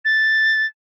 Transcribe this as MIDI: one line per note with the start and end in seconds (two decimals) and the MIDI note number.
0.05 0.66 93